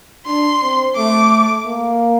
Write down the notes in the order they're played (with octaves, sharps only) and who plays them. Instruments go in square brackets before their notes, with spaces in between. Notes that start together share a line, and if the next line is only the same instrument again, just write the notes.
[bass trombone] D4 [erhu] C6
[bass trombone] C4
[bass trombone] A3 [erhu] D6
[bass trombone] A#3